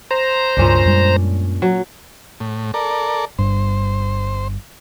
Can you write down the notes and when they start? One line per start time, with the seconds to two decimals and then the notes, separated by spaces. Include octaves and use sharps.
0.11 C5 A#5
0.57 C#2 G2 A#2 C#4 D4
0.86 F#2 G3 G#3
1.62 F#3
2.40 A2
2.74 A4 A#4 D5
3.39 G1 G2 C5